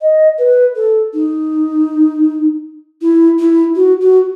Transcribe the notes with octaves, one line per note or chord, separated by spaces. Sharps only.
D#5
B4
A4
D#4
E4
E4
F#4
F#4